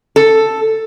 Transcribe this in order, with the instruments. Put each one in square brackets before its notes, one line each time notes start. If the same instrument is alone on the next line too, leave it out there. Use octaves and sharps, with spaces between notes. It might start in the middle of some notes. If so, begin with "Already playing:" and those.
[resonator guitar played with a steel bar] A4